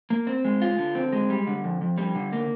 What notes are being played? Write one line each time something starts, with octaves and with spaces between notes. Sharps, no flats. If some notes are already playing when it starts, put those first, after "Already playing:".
A#3
C4
G#3
F4
D3
C4
G#3
G3
D3
F2
F2
G3
D3
A#3